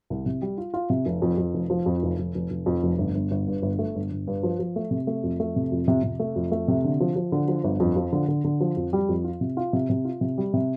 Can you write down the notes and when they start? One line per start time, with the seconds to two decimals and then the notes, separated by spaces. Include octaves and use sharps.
0.10 C2
0.26 C3
0.42 G3
0.58 F4
0.74 F4
0.90 C3
1.06 F1
1.22 F2
1.38 F2
1.54 F1
1.70 F3
1.86 F2
2.03 F1
2.19 F1
2.35 F1
2.50 F1
2.66 F2
2.83 F1
2.98 G1
3.15 G1
3.31 G1
3.47 G2
3.62 G1
3.79 A3
3.95 G1
4.11 G1
4.27 G2
4.43 F3
4.59 F3
4.76 A3
4.91 C3
5.07 A3
5.23 F2
5.40 A3
5.56 C3
5.72 F2
5.88 C3
6.04 C3
6.20 A3
6.36 F2
6.52 A3
6.68 C3
6.84 D3
7.00 F3
7.16 F3
7.32 D3
7.48 F3
7.64 G1
7.80 F2
7.96 F3
8.12 D3
8.28 D3
8.44 D3
8.60 F3
8.77 F2
8.93 G3
9.09 F2
9.24 F4
9.41 C3
9.57 F4
9.73 C3
9.90 C3
10.05 F4
10.21 C3
10.38 G3
10.54 C3